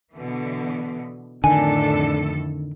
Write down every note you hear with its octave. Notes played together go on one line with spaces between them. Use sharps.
B2 D3 E3
F2 A2 D3 D#3 D4 A4 G#5